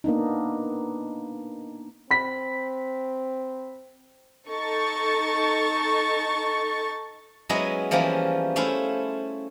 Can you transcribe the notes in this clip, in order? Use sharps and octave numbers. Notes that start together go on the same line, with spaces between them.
A#3 B3 D4 D#4
C4 B5 B6
D#4 A4 C#6 A6
F#3 G#3 B3 C#4 E4 D#5
E3 F3 G3 A#3 B3 C#4
A3 C#4 E4 C5 F5